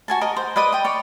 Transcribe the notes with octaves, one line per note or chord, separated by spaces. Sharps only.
F#4 G#5 A5
A#4 D#5
C5
B4 D5 D#5 D#6
G5 D#6
C#5 D5